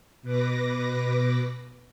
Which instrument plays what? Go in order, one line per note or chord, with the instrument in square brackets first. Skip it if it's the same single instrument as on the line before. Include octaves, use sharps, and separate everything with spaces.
[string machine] B2 B4 D6 A#6